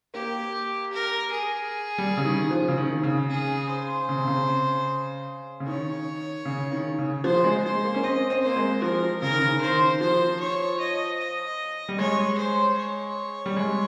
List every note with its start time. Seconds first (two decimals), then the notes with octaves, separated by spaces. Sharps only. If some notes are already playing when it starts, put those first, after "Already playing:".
0.14 A#3 G4
0.93 A#4
1.32 G#4
1.98 G3
2.17 C#3
2.24 D#3
2.51 F3
2.68 C#3
2.77 D#3
3.03 C#3
3.30 G#4
3.69 C5
4.09 C#3
4.18 C3
4.28 C#3
5.60 C#3
5.67 D#3 C#5
6.45 C#3
6.71 D#3
6.99 C#3
7.24 F3 C5
7.44 G#3
7.64 G#3 C5
7.84 A#3
7.94 C#4
8.03 C4 D#5
8.30 C4
8.43 A#3 C5
8.56 G#3
8.82 F3 A#4
9.22 C#3 A#4
9.31 D#3
9.41 C#3
9.62 D#3 C5
10.01 F3 C5
10.40 C#5
10.80 D#5
11.20 D#5
11.89 G3
11.99 G#3 C#5
12.38 C5
12.78 C#5
13.46 G3
13.57 G#3